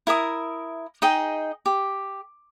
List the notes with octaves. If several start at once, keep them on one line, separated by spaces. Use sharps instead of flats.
E4 A#4 E5 D#6
D#4 G#4 D#5 G5
G4